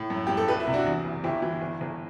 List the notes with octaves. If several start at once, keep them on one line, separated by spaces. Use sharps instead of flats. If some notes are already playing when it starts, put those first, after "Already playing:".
Already playing: A2
F#2
F#2 G4
A4
C2 G4 B4
E4
C3
D4 F#4
E2
F#1
G1 E4 G4
E3
G1
G1